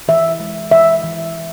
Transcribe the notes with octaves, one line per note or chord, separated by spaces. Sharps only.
E3 E5
G#3
E3 E5
E3